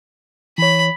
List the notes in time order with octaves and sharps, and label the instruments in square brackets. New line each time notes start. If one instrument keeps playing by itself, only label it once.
[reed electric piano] E3 C#5 [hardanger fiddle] B5